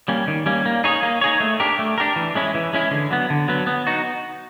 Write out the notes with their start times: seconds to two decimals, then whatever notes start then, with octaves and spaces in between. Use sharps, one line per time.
0.08 G3 A#3 C#4
0.28 D#3
0.46 G3 A#3 C#4
0.66 A#3
0.84 D#4 G#4 C#5
1.03 A#3
1.21 D#4 G#4 C#5
1.40 A3
1.60 D4 G4 A#4
1.79 A3
1.98 D4 G4 A#4
2.16 E3
2.35 G#3 C#4 E4
2.55 E3
2.73 G#3 C#4 E4
2.91 D3
3.10 F#3 B3
3.30 D3
3.48 F#3 B3
3.67 B3
3.87 D#4 F#4